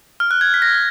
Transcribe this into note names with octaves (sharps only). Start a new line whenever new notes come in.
F6
F#6
G#6
B6
A#6